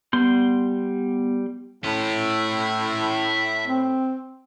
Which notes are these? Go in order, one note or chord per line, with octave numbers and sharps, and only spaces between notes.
G3 B3 C6 G6
A2 E5 C6
C4